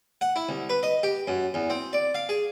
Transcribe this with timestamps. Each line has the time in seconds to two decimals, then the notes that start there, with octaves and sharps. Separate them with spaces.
0.21 F#5
0.36 E4
0.49 C2
0.70 B4
0.83 D#5
1.03 G4
1.27 F#2
1.54 E2
1.70 C4
1.93 D5
2.15 F5
2.29 G#4